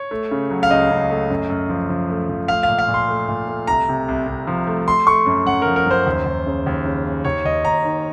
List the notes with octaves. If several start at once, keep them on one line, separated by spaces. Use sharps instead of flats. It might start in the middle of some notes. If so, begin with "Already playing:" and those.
Already playing: C#5
A3
C#3
F#3
F5
C#2 D#5
C#2
A3
F#2
F#2
F3
F3
A3
F3
A3 F5
A#2 F5
F5
A#2
C6
A3
A#2
A3
C2 A#5
C3
C2
C2
F3
A3
A3 C6
A3 C#6
F#2
F#2 F#5
F3 A#4
A#4
F#2 C5
D#2
D#2
C#3
D#2
C#3
C#3
D#2 C#5
D#2 D#5
D#2 A#5
D#3